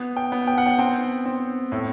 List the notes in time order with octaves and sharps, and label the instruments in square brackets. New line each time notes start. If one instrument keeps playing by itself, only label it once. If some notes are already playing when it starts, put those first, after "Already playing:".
Already playing: [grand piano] B3
G5
B3
G5
F#5
G5
C4 G5
C4
A2